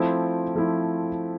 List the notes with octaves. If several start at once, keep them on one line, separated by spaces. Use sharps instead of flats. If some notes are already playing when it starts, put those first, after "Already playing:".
Already playing: F3 A3 C4 E4
F3 A3 C4 E4